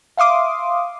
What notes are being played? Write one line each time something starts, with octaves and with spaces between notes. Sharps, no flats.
E5 F5 C6 D6 D#6